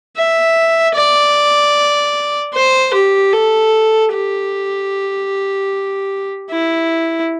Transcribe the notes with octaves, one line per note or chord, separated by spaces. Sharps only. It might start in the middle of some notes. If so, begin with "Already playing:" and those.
E5
D5
C5
G4
A4
G4
E4